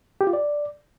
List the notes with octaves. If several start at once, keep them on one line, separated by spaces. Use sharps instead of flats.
G4
F4
D5